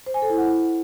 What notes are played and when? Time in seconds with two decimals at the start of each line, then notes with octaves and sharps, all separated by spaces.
0.06 C5
0.14 G#5
0.22 A4
0.30 E4
0.38 F#5